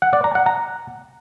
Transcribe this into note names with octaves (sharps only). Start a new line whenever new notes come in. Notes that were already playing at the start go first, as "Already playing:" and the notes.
F#5
D5
A#5
F#5
A#5